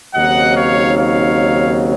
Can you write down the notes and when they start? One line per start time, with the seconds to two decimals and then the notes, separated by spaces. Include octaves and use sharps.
0.14 D#2 C#3 F#3 C4 D#4 D#5 F#5
0.55 C#5 F5
0.97 C#5 F5